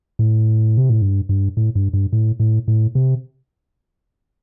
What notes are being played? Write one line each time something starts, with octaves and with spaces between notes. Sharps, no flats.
A2
C3
A2
G2
G2
A2
G2
G2
A2
A2
A2
C3